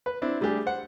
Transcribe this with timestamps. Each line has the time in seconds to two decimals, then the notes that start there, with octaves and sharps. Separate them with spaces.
0.06 B4
0.22 C4 D4 E4
0.41 G3 A3 D4 G4 G#4
0.66 C5 F#5